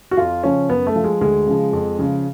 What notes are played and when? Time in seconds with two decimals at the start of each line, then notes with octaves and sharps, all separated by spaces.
0.11 F#4
0.17 F2 F4
0.43 C#3 F3 C#4
0.69 F#2 B3
0.87 A3
0.96 F3
1.04 G#3
1.21 D2 G#3
1.47 C#3 F3
1.73 F2
1.99 C#3 F3